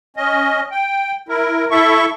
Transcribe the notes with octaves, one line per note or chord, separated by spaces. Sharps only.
C#4 D#5
G5
E4 A#4
E4 A4 E5 C#6